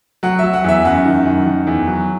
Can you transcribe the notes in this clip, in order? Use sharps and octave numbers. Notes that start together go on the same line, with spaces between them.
F#3 F#5
F#3 E5
F#5
E2 E5
F#2 F#5
D#3
F#2
D#3
E2
F#3